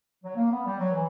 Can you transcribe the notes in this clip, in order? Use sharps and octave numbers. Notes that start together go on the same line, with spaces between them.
F#3
A#3
B3
G3
F#3
E3